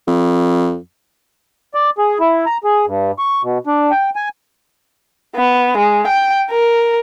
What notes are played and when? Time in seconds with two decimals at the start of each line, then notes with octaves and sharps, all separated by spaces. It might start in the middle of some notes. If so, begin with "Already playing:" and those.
0.07 F2
1.75 D5
1.98 G#4
2.20 E4
2.46 A#5
2.64 G#4
2.86 G2
3.19 C#6
3.43 B2
3.67 D4
3.91 G5
4.16 G#5
5.36 B3
5.77 G#3
6.07 G5
6.50 A#4